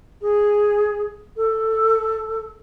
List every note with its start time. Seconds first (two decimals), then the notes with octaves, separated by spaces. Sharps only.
0.21 G#4
1.36 A4